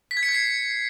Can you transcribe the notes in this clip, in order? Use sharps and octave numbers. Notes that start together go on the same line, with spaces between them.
B6
G#6
C#7
G#6
C7